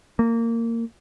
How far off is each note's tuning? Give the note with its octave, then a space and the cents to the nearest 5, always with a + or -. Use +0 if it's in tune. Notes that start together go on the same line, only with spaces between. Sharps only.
A#3 -20